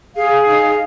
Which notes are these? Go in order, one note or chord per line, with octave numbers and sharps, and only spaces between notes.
G#4 F5
D#4 F5